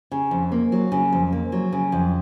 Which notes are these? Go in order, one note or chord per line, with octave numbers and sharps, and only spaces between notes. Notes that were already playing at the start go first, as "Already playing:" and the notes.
C#3
F2
A#3
F#3
C#3
F2
A#3
F#3
C#3
F2